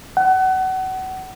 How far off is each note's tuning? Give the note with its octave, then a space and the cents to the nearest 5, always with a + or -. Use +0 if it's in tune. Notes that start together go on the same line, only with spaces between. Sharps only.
F#5 +30